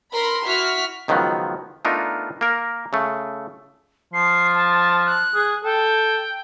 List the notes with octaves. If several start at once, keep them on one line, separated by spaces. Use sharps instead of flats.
A#4 B5 C6
E4 F#4 F6 B6
C#2 D#3 F3 F#3 B3
A3 B3 D4 D#4 F4 A#4
A#3 A#4
C#3 A3
F3 C7
A5
F#6
G#4
A4 G5